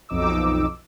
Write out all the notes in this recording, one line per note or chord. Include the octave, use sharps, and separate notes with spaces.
B1 F2 D#4 D6 E6